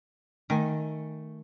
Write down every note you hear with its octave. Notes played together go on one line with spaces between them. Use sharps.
D#3 A3 G#5